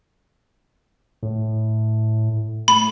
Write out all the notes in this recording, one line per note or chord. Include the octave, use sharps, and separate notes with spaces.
A2
A2 B5